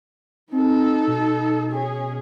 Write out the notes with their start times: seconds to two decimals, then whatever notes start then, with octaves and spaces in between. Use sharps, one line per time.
0.52 C4 D#4 A4
1.07 B2
1.71 C#4 G#4